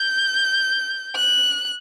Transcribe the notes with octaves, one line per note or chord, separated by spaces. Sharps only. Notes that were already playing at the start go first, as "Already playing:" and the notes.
Already playing: G6
F#6